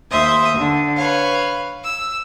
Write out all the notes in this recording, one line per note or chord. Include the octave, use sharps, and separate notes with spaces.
D#2 C5 E5 D#6
D3
B4 C#5 F5
E6